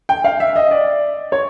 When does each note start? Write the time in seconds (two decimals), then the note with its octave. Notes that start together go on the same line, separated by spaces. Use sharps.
0.09 G5
0.24 F5
0.40 E5
0.56 D#5
0.71 D5
1.32 C#5